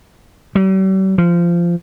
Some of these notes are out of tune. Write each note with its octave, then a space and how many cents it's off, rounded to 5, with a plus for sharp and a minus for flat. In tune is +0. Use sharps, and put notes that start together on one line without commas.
G3 -45
F3 -20